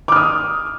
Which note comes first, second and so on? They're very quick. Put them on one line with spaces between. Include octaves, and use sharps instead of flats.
D6 F6 D#6